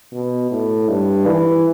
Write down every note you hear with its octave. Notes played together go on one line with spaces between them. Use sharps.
B2
A2
G2
E3